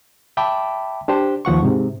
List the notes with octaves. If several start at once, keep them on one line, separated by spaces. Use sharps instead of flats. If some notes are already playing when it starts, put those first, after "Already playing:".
E5 G5 A5 B5 D6
D4 G4 C5
D#2 F3 F#5 C#6
G#2 C3